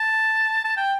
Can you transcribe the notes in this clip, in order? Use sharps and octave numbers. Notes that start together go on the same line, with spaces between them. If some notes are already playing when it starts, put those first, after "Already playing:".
Already playing: A5
A5
G5